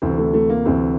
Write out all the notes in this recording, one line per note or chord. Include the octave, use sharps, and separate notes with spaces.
D2 C3 E3 C4
A3
A3
A#3
D2 C3 E3 C4